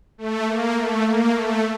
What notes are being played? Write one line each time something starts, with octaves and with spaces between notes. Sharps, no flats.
A3
A#3
A3
A#3
A3